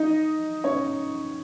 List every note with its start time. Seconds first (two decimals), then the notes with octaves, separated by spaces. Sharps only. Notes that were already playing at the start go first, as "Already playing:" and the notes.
Already playing: D#4 D#5
0.64 C#4 C#5